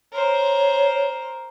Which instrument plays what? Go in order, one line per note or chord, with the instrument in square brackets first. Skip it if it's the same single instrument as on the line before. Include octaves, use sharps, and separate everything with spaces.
[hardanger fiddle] A#4 C5 [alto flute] C#5